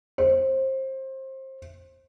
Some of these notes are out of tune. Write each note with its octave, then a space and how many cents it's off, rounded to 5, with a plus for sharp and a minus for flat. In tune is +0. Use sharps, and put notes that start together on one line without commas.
C5 +25